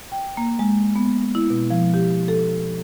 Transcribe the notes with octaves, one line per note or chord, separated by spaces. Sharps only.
G5
A#3
G#3
B3
E4
B2
F3
G4
A4